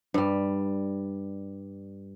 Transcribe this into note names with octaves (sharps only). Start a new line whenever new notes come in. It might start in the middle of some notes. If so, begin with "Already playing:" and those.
G2 G3